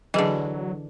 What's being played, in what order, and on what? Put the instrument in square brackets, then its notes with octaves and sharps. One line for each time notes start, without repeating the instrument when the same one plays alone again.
[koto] D3 E3 [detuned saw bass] F#3 [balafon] G#4 D#5